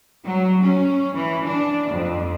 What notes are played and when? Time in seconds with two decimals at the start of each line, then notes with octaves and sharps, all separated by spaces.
0.24 F#3
0.63 C#4
1.16 E3
1.46 D4
1.91 F2